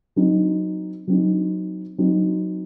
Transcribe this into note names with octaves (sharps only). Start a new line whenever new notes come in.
F#3 C4 D#4
F#3 C4 D#4
F#3 C4 D#4